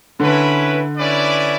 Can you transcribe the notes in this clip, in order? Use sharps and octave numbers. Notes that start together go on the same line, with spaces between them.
D3 C#4 E4 B4
C#4 E4 B4 D5